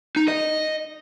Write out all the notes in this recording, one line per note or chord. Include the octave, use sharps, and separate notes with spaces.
D#4
D#5